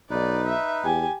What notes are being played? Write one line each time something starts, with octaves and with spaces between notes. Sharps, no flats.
B1 D#4 B4 D5
E5
E2 G4 G#5